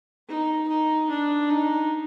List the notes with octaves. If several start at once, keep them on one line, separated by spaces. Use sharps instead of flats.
D#4
D#4
D4
D#4